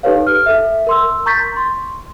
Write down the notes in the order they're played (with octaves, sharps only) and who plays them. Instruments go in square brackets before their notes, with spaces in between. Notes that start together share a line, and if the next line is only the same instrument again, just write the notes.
[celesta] D#4 G4 A4 B4 C#5 F5
F6
A4 E5
A#4 C6 E6
A#5 C#6 G6 A6 B6
C6